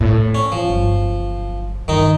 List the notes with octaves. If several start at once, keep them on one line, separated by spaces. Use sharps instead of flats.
A2
C#4
F3 G#3
G1 F#3
G2 D3 D#3 D#4